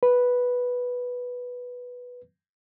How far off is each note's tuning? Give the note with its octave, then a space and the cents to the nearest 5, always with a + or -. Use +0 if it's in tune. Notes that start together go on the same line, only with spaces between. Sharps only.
B4 -5